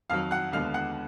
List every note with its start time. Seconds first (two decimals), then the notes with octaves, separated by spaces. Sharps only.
0.10 F2 D#3 F#3 F5 F6
0.31 F#5 F#6
0.52 D#2 D3 G#3 B3 F5 F6
0.74 F#5 F#6